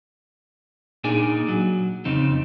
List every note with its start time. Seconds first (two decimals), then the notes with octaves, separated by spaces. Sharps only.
1.04 A#2 D4 D#4 G#4 D5 G#5
1.48 F#3
2.05 F2 C#3 C4 D#4